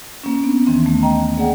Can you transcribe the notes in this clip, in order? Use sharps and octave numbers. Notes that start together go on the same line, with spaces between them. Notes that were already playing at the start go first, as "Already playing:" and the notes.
A#3 C#4
B3 D4
D#2 D#3 E3 C4
A3
D#5 G5 A#5
A#3 G#4 D5 F#5 G5